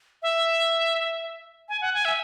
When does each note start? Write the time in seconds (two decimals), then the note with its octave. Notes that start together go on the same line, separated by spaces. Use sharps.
0.22 E5
1.69 G#5
1.81 F#5
1.94 G#5
2.05 E5